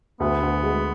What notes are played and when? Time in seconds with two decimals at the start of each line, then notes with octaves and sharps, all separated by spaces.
0.20 D2 B3
0.42 D2
0.63 G#3